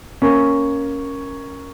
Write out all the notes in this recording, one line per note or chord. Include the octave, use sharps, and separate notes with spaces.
A#3 C#4